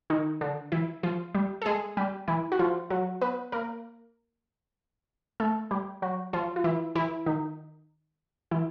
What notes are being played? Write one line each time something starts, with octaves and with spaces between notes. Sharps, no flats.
D#3 D#4
D3 D4
E3 E4
F3 F4
G3 G4
A4
G#3 G#4
G3 G4
E3 E4
F#4
F3 F4
F#3 F#4
B3 B4
A#3 A#4
A3 A4
G3 G4
F#3 F#4
F3 F4
F4
E3 E4
E3 E4
D#3 D#4
E3 E4